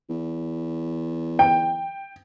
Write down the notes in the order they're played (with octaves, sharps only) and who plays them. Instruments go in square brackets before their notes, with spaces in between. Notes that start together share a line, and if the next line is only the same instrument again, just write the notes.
[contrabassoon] E2
[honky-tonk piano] G5